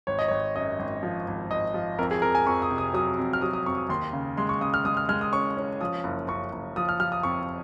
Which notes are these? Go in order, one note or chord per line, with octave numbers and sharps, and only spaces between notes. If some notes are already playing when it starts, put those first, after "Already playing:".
G#1 C#5
D#5
G#1 C#5
F#2 D#5
G#1
F3
G#1
G#1 D#5
F3
F2 A#4
G#4
F2 A#4
G#5
F2 C#6
D#6
C3
D#6
F#3 D#6
F2
F6
F#3 D#6
D#6
F2 C#6
D#6
D#2 C6
C#3
G#3 C6
C#6
C#3 D#6
F6
G#3 D#6
F6
G#3 F6
D#6
C#4 C#6
C#4
F3 D#6
F#1
F#1 C#6
F#1
F3 D#6
F6
F3 F6
D#6
F2 C#6